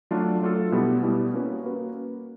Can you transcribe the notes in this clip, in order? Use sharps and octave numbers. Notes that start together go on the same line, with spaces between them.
F#3 A3 D4 F4 A4
F#3 A3 D4 F4 A4
B2 G3 B3 E4 G4
B2 G3 B3 E4 G4
A#3 C#4 F#4 B4
A#3 C#4 F#4 B4